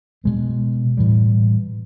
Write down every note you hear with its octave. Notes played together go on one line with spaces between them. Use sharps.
B2 G#3 B3
A2 E3 G3